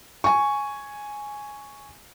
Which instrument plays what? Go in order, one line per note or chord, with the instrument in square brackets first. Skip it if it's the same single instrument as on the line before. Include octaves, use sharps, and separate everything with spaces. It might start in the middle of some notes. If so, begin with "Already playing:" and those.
[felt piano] G#5 C#6